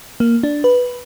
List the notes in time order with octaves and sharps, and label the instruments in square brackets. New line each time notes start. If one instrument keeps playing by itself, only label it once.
[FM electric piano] A#3
D4
B4